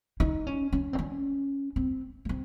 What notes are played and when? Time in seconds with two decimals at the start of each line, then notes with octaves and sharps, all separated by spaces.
0.20 D#4
0.47 C#4
0.73 C#4
0.93 C4
0.99 C#4
1.76 C4
2.25 A#3
2.29 C4